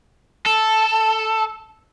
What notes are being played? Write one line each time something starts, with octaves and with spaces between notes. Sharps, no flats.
A4